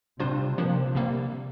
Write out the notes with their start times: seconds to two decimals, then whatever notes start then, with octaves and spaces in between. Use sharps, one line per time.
0.20 C3 G3 D4 F4 C5
0.58 C3 F3 A#3 D4
0.95 C3 G3 A#3